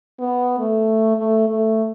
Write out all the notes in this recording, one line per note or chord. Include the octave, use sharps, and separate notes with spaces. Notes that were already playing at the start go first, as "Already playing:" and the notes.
B3
A3
A3
A3